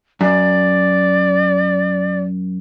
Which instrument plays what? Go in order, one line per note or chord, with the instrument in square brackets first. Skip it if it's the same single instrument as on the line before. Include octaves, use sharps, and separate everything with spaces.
[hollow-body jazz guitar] F#2 [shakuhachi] D5